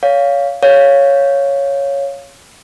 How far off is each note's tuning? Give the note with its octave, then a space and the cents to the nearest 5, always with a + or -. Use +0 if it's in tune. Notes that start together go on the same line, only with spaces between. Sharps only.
C#5 +25 F5 +0
C#5 +0 F5 +0